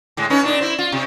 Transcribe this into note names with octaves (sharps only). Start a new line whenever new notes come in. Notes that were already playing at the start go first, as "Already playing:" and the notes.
A2 G#3
C#4 D#4 B4
A#2 D4 D#4
E4 C5
F4
C3